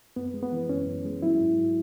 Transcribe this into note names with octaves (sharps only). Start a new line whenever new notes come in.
F#2 B3
G#3
B3
E3
F#2 C#4
F#2
G#3
F#3 E4
G#2
F#3